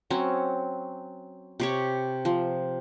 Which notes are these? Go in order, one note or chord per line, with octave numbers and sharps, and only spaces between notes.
F#3 C4 C#4
C3 G4 C#5
F3